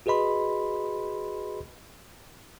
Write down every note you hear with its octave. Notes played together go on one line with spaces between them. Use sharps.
F#4 G#4 B4 D#5 B5 C6